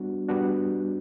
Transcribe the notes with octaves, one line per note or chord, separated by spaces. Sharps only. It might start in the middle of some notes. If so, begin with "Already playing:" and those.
Already playing: G3 B3 D4 F#4
G3 B3 D4 F#4